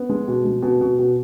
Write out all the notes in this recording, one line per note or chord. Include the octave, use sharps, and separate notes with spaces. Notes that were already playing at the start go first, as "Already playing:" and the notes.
Already playing: B3
G#3
B2
G#3
B2
B2
B2